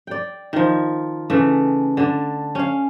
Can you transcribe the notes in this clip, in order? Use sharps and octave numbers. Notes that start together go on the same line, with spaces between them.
D5 G5
D#3 F3
C#3 E3 A3
D3 D4
C#4 F5